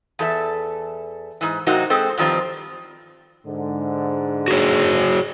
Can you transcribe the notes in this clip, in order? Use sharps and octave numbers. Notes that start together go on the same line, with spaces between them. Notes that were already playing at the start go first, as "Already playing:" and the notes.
E2 A4 E5
G#2 E3
C3 F#3 A#3 C4 D#4 F#4
G#3 C4 G#4 A4 C5
G2 D#3 F3 G3 C4
G#2 D3
F#4 G#4 C#5